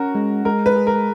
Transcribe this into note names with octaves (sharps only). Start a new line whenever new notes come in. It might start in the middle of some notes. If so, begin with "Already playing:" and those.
Already playing: C#4 F#4 A#4
G#3
G#3 A#4
B4
G#4
A#4